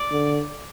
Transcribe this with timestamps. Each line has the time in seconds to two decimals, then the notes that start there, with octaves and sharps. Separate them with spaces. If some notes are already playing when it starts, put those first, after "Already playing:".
Already playing: D5
0.11 D3